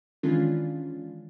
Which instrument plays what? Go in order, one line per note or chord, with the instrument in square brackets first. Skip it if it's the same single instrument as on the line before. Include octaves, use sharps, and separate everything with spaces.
[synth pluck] D#3 E3 G#3 C#4 D4 F4